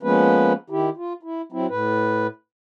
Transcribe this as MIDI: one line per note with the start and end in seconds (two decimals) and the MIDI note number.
0.03 0.53 53
0.03 0.53 56
0.03 0.53 58
0.03 0.53 59
0.03 0.53 61
0.03 0.53 71
0.70 0.90 51
0.70 0.90 64
0.70 0.90 67
0.97 1.13 65
1.23 1.42 64
1.52 1.67 54
1.52 1.67 60
1.52 1.67 64
1.69 2.27 45
1.69 2.27 71